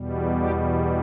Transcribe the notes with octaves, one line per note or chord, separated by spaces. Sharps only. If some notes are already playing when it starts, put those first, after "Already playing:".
Already playing: E2 B2 G3
G4